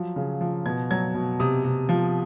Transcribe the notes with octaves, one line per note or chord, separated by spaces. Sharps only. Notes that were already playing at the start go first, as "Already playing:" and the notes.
Already playing: F3 F#3
C#3
F3
B2 G#6
F#3 G#6
B2
C3 D#6
C3
F3